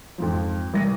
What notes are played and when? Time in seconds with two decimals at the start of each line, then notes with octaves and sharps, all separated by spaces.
0.18 F2 G#2 F3
0.74 C2 A#6 D#7